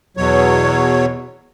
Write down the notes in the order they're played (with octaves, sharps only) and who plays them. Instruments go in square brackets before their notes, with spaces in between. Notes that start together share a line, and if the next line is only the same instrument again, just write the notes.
[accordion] E2 B2 F#3 C#5